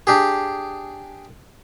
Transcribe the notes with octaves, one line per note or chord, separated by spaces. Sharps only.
D4 G4 G#4